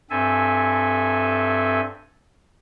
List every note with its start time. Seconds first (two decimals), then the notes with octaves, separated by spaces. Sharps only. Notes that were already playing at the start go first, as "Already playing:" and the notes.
0.10 G2 C4 A4 E5 G#5